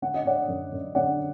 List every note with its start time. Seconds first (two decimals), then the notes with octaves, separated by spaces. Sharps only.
0.02 D3 F#5
0.14 D#5
0.25 D3 D5 F#5
0.48 F#2
0.72 F#2
0.95 D3 D5 F#5